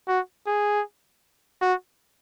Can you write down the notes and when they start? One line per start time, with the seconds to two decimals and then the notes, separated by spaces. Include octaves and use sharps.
0.08 F#4
0.46 G#4
1.62 F#4